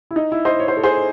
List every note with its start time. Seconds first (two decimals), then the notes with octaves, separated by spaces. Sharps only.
0.11 E4
0.16 D#4
0.32 E4
0.45 C5 D#5
0.60 C#5
0.68 C5
0.77 A4
0.84 G#4 C5